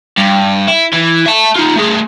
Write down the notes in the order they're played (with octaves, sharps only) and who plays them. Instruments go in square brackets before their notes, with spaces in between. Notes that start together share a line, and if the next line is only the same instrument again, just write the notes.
[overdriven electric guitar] G2
E4
E3
E5 A5
D#4 F4
A3 G#4